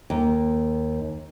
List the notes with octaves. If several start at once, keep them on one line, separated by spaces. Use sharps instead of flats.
D#2